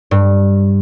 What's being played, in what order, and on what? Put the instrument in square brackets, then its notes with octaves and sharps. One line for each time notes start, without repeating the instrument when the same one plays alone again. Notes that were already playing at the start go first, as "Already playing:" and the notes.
[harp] G2